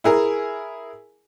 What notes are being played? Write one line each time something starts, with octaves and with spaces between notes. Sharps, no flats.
E4 G#4 A#4